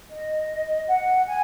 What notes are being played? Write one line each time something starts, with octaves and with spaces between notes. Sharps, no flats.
D#5
F#5
G#5